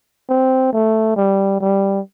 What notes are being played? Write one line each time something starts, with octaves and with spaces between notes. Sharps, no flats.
C4
A3
G3
G3